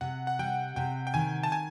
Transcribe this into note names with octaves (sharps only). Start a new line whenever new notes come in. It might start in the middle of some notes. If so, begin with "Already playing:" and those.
C3 F#5
F#5
G3 G5
C3 G5
G5
D#3 G#5
A5
G#5